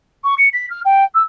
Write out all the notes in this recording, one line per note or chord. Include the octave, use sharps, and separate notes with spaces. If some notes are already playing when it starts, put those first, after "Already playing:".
C#6
C#7
B6
F6
G5
E6